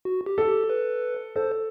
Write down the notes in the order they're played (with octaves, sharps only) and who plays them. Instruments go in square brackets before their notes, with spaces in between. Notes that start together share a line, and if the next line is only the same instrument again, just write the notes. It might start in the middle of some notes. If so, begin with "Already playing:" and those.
[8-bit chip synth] F#4
G4
[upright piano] A4
[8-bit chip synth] G4
B4
[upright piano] A4 [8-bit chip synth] C5